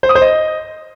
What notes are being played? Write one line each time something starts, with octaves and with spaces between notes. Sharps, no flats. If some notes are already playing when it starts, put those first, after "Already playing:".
C5
D#6
C5
D#5